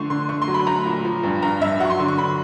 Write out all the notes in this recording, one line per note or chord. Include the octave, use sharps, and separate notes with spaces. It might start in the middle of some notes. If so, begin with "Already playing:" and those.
Already playing: D3 F3 A3 C6 C#6
D3 C6
A3 C#6
C6
F#3
B5
A3 A#5
A#2
F3
G2
G2 A#5
G2 E5
F#3 F#5 C#6
C6
D3
C#6
D3 B5